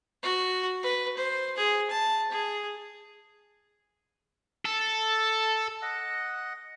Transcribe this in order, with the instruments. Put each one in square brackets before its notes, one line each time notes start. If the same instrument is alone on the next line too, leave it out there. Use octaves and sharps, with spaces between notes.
[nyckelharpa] F#4
B4
C5
G#4
A5
G#4
[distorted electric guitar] A4
[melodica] D#5 F#5